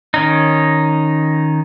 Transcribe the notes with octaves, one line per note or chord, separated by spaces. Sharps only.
D#3 C#4 D#4